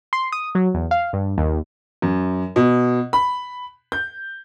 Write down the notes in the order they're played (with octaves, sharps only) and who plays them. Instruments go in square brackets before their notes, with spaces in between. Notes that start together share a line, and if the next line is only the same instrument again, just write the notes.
[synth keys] C6
D#6
F#3
E2
F5
G2
D#2
[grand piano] F#2
B2
B5
G6